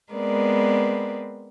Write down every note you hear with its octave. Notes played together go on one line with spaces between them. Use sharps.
G#3 B3 C4 A#4 B4 D5